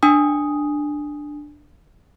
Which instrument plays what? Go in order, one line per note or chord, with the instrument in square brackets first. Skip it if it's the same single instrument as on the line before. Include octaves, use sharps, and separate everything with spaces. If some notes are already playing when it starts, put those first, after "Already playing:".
[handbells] D4 G#5 D#6